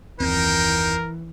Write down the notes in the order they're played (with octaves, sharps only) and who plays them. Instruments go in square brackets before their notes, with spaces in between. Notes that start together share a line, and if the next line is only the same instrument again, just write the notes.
[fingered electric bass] F#1 D#2 C4 [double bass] E3 [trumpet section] D#4 C5 G5 [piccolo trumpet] A#4